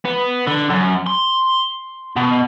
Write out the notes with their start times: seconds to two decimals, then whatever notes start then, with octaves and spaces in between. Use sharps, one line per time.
0.05 B3
0.47 D3
0.70 F#2
1.07 C6
2.17 B2